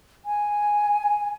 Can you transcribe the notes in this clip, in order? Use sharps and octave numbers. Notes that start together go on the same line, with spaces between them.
G#5